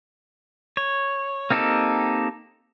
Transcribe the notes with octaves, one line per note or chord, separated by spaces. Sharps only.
C#5
A#3 C4 D#4 G4 A4